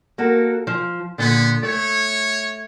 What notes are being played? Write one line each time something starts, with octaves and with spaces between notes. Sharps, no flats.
A#3 F#4 A4
F3
A#2 D3 B3
A3 C#5